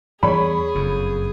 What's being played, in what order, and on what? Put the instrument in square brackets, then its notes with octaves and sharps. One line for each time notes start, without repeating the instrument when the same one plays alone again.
[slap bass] E2 G3 [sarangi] G#4 [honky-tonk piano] C#5 B5
[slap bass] F#1 F2